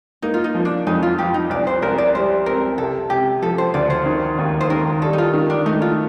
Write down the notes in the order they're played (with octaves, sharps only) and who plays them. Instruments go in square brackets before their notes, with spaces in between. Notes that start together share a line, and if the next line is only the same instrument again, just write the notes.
[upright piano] A#3 [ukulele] D#4
[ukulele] F4
D#4
[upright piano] F3
[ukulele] D4
[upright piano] F2 [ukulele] D#4
[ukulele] F4
[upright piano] F3 [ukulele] G4
[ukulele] D#4
[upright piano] C2 [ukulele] D5
[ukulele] C5
[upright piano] C2 [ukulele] A#4
[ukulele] D5
[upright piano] G3 [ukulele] C5
[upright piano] C4 [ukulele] A#4
[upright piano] C3 [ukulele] A4
[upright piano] C3 [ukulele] G4
[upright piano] F3 [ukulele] A4
[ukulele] C5
[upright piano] D2 [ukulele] D5
[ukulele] C5
[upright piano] D#3
D#2
[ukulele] C5
[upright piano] D#3 [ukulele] A#4
[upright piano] G3 [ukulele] A4
[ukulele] D#4
F4
[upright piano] D#3
[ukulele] D4
[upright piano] A3 [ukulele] D#4
[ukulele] F4